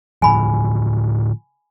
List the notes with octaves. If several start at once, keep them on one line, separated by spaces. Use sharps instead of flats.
A2 D3 F3 G#5 B5